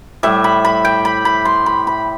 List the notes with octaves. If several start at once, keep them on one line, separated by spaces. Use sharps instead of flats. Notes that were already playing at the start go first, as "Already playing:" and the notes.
A2 G3 E5
B5
B5
G5
B5
B5
C6
B5
B5